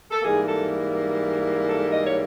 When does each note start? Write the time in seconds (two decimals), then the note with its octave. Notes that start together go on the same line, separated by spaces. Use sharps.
0.11 A4
0.22 G#2 E3 G3 A#3 G#4
0.47 A4
1.67 A4
1.92 D#5
2.06 C#5